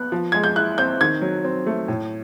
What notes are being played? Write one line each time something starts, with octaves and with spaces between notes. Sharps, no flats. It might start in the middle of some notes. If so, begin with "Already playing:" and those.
Already playing: B3 F#6
F3
G#3 G#6
G6
E4 F#6
C4 G6
D#3 G#6
F#3
C4
A3
A2